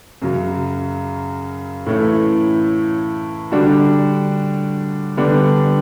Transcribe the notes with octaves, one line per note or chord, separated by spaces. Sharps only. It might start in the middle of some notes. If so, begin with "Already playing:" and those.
F#2 C#3 F#3
A2 E3 A3 C#4 E4
D3 G3 D4 F#4
D3 G3 B3 D4